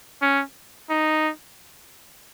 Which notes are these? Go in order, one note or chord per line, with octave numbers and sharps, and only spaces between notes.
C#4
D#4